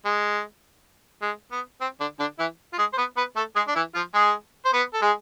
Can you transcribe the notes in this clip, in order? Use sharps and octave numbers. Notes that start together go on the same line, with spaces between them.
G#3
G#3
B3
C4
D3 D4
D3 D4
E3 E4
F4
G#3 G#4
C5
B3 B4
B3 B4
A3 A4
G#3 G#4
D4
E3 E4
F3 F4
G#3 G#4
C5
B3 B4
A4
G#3 G#4